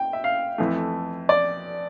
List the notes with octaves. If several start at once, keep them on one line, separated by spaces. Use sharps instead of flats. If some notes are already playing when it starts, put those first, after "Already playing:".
Already playing: G5
E5
F5
F2 E3 A3
D5